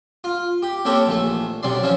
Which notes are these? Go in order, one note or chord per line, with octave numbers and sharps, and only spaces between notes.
F4
G4
A#3 C4 G4 A4 C#5
A#1 E3 A3
B1 C3 D5 C6
E3 F3 C#4